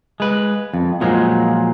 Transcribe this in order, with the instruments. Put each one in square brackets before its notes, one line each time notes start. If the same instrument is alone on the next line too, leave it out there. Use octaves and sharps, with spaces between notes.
[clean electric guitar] G#3 B4
F2
A#2 F3 F#3 G#3